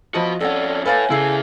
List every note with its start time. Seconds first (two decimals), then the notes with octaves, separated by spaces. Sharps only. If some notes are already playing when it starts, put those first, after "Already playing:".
0.14 F3 F#4 D#5 A5 B5
0.41 F2 C#4 A4 D5 F#5
0.85 A4 B4 C#5 F5 G#5 A6
1.10 C#3 E4 G#4 A4 C7